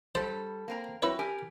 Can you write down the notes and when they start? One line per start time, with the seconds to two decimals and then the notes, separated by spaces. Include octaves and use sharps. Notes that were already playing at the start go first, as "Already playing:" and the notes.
0.15 G2 G3 A4 C5 A5
0.68 A#3 C4 A#5
1.02 C4 E4 F#4 B4 C#5
1.19 G4 A#4 G#5